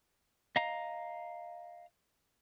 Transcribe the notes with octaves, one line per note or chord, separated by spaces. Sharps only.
D#5 F5 A#5